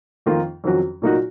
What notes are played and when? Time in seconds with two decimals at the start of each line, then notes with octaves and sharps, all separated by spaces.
0.26 F2 D#3 A#3 F4
0.64 F2 D#3 F#3 C#4 F#4
1.02 A#2 F#3 A#3 D#4 F#4